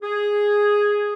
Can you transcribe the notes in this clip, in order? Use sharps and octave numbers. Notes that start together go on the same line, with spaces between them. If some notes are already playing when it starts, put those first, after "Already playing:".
G#4